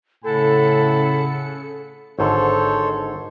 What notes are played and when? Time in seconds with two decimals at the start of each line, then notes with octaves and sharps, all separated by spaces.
0.24 A2 C#3 A4 F#5 G#5 B5 C#7
2.19 G#1 G#2 D3 A4 C5 C#5